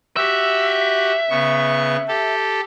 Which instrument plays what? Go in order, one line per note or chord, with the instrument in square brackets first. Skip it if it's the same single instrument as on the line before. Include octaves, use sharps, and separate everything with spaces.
[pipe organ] F#4 G4 [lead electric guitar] E5
[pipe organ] C#3 B3 C#6
G4 A4